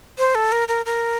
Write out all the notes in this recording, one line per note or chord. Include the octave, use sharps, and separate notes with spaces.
C5
A4
A#4
A#4
A#4